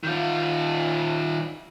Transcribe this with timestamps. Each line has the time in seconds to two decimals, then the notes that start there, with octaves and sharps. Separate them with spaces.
0.03 D#3 F4